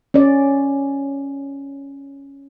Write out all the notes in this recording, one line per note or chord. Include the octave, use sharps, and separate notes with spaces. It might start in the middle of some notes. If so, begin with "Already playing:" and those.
C#4 D5